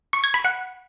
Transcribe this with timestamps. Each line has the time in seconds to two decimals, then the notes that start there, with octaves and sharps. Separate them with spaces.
0.13 C#6
0.24 G#6
0.34 B5
0.45 F#5